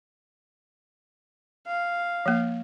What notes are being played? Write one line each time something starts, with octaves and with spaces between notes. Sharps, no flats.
F5
F3 A#3